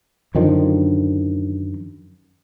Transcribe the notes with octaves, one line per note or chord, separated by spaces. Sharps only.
F#2 D3 D#3 F3